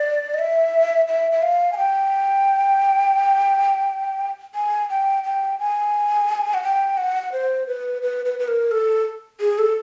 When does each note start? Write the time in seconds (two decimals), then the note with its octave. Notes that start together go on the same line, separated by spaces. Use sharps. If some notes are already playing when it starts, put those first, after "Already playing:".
Already playing: D5
0.34 D#5
0.39 E5
1.08 E5
1.32 E5
1.42 F5
1.73 G#5
1.77 G5
4.55 G#5
4.90 G5
5.24 G5
5.59 G#5
6.54 F#5
6.63 G5
6.97 F#5
7.32 C5
7.67 B4
8.02 B4
8.25 B4
8.39 B4
8.48 A#4
8.71 A4
9.40 G#4
9.58 A4